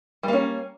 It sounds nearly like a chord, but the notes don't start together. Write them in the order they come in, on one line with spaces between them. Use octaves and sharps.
G3 A#3 C#4